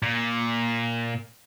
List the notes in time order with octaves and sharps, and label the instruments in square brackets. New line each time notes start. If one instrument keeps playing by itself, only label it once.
[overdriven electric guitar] A#2